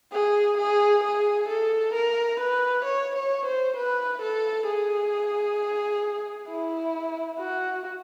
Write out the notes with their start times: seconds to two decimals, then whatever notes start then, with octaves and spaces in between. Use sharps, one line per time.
0.12 G#4
0.58 G#4
1.04 G#4
1.49 A4
1.94 A#4
2.40 B4
2.85 C#5
3.15 C#5
3.46 C5
3.77 B4
4.22 A4
4.67 G#4
6.49 E4
7.39 F#4